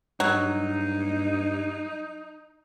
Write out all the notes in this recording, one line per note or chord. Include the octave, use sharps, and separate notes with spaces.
G2 F#3 D#4